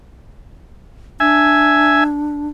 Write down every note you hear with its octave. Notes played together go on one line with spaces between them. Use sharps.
D4 E5 G#5